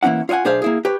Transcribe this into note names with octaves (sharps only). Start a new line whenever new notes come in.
E3 A#3 C#4 E4 F#5
F4 C#5 D#5 F#5 G#5
B1 D4 G#4 C5 E5 F5
A#3 E4 G#4
G4 B4 C#5